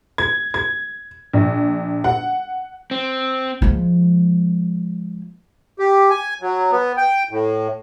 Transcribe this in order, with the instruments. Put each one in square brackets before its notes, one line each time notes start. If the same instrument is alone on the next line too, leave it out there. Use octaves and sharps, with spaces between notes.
[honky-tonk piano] G#6
G#6
A#1
F#5
[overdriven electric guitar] C4
[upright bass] F3 G#3
[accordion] G4
G#5
F#3
B3
G5
A2